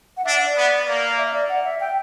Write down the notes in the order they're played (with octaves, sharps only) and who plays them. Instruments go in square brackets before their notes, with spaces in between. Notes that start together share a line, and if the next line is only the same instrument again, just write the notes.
[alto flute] F#5
[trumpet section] D4 [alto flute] E5
[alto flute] F#5
D5
[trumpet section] B3
A#3
[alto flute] E5
E5
D5
F#5
E5
G5